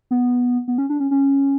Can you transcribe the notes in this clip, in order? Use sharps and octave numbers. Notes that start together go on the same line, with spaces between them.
B3
B3
C#4
D4
C#4
C#4